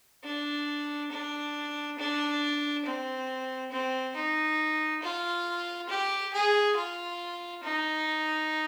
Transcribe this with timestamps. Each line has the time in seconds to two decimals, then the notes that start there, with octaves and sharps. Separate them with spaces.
0.24 D4
1.11 D4
1.98 D4
2.85 C4
3.71 C4
4.16 D#4
5.02 F4
5.89 G4
6.33 G#4
6.76 F4
7.63 D#4